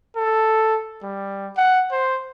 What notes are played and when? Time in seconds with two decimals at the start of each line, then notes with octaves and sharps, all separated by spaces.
0.16 A4
1.03 G3
1.57 F#5
1.92 C5